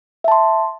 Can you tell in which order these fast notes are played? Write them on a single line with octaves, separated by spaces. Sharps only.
E5 A5 C6